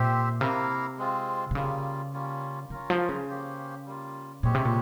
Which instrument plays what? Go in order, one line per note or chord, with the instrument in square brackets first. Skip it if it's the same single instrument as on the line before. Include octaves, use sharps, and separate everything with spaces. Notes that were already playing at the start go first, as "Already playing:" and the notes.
Already playing: [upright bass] A#2 [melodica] C4 G4 C5 E5
[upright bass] C3 [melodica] A#3 E4 A#4 F5
[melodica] G#3 C4 F4
[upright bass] C3
[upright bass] C#3 [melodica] G3 A#3 F4
[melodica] G3 A#3 C#4 F4
[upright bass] C#3 [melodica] C#4 F4 A#4
[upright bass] F3
C#3
[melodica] A#3 C#4 G4 C5
G3 A#3 F4
[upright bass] A#2 [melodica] G#3 C4 G4 C#5
[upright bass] C3
A#2